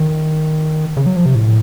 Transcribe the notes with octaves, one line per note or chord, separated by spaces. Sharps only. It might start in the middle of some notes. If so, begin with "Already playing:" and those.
Already playing: D#3
C#3
F#3
F3
C3
A2